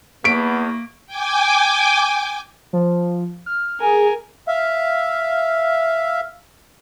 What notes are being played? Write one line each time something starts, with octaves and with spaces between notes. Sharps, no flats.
E2 A#3 B3 C#6 B6 D7
G5 G#5 D6
F3
F6
G#4 A#4 G#5
E5 F5